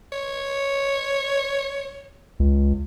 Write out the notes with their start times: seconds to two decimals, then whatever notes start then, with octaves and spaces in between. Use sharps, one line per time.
0.12 C#5
2.40 C#2